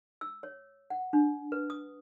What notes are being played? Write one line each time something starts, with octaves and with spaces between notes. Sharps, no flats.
E6
C#5
F#5
D4
B4
D#6